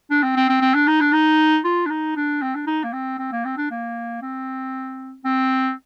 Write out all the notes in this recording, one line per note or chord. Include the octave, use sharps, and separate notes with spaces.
D4
C4
C4
C4
C4
D4
D#4
D4
D#4
F4
D4
D#4
D4
C4
D4
D#4
A#3
C4
C4
A#3
C4
D4
A#3
C4
C4